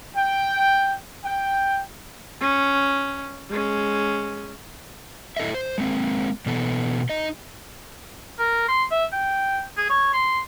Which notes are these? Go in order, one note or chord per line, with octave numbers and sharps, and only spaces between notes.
G5
G5
C#4
G#3 C#4
E4 A4 D#5 E5
C5
G#3 A#3 C4
B2 E3 B3 A4
D#4 D#5
A#4
C6
E5
G5
G#4
C#5
C6